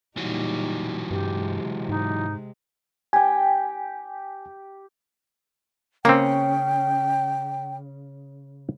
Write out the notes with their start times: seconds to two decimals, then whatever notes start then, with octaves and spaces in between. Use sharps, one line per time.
0.17 A#2 E3 F#3 G3 D#4
1.11 G2 C3 G#3 G4
1.89 G#2 D#4
3.13 G4 G5 G#5
6.05 C#3 A#3 C4 G5